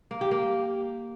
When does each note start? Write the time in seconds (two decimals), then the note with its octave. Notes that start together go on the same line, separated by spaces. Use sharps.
0.11 A#3
0.21 G4
0.31 A#3